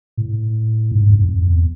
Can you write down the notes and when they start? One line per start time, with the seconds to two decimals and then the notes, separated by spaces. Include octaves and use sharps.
0.17 A2
0.92 G#2
1.10 F2
1.28 F2
1.47 E2